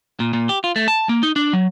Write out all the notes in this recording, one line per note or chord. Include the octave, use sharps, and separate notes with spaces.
A#2
A#2
G4
F4
A3
A5
A#3
D#4
D4
F#3